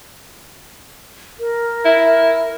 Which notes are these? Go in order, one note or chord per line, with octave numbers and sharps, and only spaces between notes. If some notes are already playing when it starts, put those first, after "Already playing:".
A#4
E4